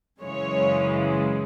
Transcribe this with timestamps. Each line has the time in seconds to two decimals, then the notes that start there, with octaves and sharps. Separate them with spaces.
0.22 F#2 C#3 E3 G#3 C#5